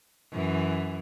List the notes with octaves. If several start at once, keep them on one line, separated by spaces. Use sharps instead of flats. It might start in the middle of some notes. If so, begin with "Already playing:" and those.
F#2 E3